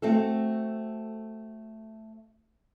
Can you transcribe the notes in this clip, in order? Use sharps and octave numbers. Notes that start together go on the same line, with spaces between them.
A3 C4 F#4 A4